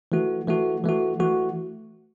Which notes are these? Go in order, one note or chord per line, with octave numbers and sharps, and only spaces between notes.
E3 A3 F#4
E3 A3 F#4
E3 A3 F#4
E3 A3 F#4